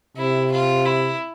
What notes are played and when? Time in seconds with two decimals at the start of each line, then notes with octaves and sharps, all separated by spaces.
0.17 C3 E4
0.52 F4
0.86 E4